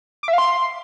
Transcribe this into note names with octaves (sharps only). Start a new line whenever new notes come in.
D6
E5
F5
C6